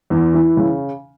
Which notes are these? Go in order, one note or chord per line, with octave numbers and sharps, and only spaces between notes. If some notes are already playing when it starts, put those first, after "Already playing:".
E2
E3
C#3